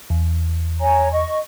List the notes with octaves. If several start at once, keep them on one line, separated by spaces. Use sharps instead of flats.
E2
C#5 G#5 A#5
D#5 C#6